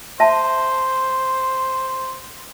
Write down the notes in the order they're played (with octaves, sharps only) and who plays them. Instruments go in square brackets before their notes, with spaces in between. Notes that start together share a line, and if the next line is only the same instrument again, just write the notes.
[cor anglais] C5 [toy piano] E5 A5